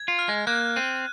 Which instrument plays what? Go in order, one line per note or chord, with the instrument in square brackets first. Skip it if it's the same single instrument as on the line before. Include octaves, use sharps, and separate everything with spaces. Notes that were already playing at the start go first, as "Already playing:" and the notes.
Already playing: [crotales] G#6
[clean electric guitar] F4
[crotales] F6
[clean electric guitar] G#3
[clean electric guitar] A#3 [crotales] F#6
[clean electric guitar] C4 [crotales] D#7